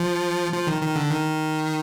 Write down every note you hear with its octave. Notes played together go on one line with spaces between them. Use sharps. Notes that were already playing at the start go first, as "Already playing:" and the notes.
Already playing: F3
F3
D#3
D#3
D3
D#3